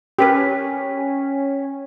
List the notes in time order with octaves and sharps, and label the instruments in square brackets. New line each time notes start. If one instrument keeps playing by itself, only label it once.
[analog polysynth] C#4 [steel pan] G4 A#4 B4 [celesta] G5 B6